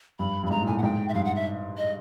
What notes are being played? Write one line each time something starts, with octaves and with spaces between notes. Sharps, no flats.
G2 B5
G2
B5
G#2 A#5
A#2
A2 G#5
F#5
G#2 G5
E5
G2 F5
F#5
E5
D#5